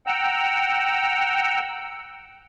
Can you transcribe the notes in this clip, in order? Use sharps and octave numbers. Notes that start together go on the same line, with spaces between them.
F#5 G5 A#5 E6